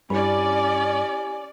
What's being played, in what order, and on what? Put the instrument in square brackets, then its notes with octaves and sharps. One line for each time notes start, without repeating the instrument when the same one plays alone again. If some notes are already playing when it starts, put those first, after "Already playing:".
[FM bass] G2 [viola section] C#4 D5 [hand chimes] E4 G4 B5 [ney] G#5